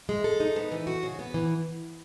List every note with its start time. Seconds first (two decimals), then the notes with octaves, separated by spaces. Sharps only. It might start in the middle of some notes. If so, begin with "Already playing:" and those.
0.09 G#3
0.24 A4
0.40 D#4
0.56 B3
0.72 E3
0.87 F#4
1.03 C#3
1.19 B3
1.34 E3